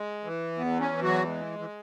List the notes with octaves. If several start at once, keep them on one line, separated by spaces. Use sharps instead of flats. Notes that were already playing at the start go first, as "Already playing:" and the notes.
Already playing: G#3
E3
E2 B3
C#4
E3
F#3 F#4
G#3
E3